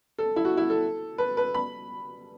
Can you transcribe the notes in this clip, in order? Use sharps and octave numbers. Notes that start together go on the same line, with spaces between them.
A4
E4
F#4
E4
A4
B4
B4
B5